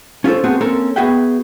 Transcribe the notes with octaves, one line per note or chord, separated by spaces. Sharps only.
C#4 F4 G4 A4 C5
A3 B3 C4 F#4 G#4
A#3 C4 C#4 A4 A#4
B3 F#4 G#4 E5 F#5 G5